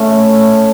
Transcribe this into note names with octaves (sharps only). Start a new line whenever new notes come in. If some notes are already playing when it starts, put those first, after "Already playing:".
Already playing: A3 C#4